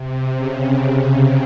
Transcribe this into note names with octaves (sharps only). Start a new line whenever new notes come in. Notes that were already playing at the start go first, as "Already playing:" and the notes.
Already playing: C3
C#3